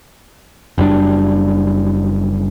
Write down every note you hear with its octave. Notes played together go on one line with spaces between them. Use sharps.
F#1 F#2 G3 D4